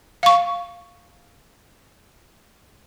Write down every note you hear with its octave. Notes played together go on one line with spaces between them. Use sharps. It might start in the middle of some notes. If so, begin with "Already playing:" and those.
F5 C#6